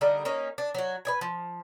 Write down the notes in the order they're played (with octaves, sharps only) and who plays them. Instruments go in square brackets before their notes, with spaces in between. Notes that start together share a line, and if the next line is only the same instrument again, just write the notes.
[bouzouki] D3 G3 D#4 A#4
A#3 C#4 D#4
D4
F#3 F#4
B4 D#5 G#5
F3